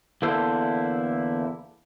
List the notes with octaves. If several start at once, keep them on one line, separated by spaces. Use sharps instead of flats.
E2 D3 A#3 E4 A4 C5